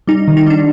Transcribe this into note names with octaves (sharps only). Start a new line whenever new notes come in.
G3 D#4
D#3
D#4
G3 D4